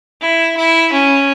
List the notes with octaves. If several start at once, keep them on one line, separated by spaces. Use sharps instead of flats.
E4
E4
C#4